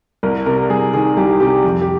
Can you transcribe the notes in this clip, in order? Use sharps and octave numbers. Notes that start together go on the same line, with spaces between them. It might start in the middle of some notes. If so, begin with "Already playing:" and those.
C2 A#4
C3 A#4
C2 G#4
D#3 G#4
C2 G4
C3 G4
F2
G4